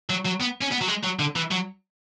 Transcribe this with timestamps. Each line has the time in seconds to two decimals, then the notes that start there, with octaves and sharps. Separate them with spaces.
0.10 F#3
0.26 F#3
0.41 B3
0.62 C#4
0.72 B3
0.82 F#3
0.88 G#3
1.04 F#3
1.19 D3
1.36 E3
1.51 F#3